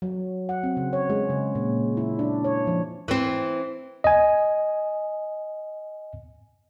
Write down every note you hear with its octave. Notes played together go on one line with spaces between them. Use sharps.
F#3
F#5
C4
C#3
C#5
G#3
C#3
A#2
E4
D4
C#5
F3
E3 C4
D#5 G#5